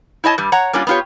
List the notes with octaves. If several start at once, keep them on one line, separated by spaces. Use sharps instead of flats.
E4 C#5 D#5 A5
G2 G3
C#5 F#5 A#5
G3 A#3 C#4 D4 F4
B3 D4 F4 G4 C#5